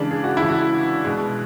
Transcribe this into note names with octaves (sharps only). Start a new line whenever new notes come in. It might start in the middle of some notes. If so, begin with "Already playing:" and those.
Already playing: C#3 E3 G#3 D4
G#4
F#4
E4
C#3 E3 G#3
F#4
B2 G#3